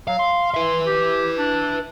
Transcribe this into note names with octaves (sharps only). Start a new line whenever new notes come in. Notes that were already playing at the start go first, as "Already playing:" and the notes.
F#3 F5
C6
B4 E5
G4
D4